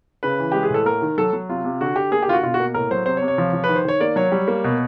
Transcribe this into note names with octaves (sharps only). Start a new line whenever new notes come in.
C#3 B4
E3
G#3 G4
G#4
A2 A4
A#3 A#4
D#3
F#3 A4
F#3
C3 F4
C3
D3 F#4
D3 G4
A#3 G#4
G4
D3 F4
F#4
B2 F4
F#4
A#3
A2 A#4
F#3 C5
C3 C5
C#5
C3
C#5
F3
F3
B4
D#3
C5
D#3 C#5
A#3 D5
F#3 C#5
G3
A#3
B2